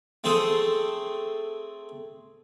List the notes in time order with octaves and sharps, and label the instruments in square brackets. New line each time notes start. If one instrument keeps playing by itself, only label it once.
[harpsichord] A3 C4 G#4 A4